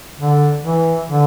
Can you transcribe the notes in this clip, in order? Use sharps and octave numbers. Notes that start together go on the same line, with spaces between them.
D3
E3
D3